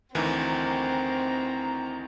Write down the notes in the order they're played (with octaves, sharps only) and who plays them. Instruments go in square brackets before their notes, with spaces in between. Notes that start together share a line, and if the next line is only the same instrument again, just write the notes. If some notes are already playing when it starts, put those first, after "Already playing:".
[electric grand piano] D2 D#3 E3 [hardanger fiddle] C4 [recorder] A#5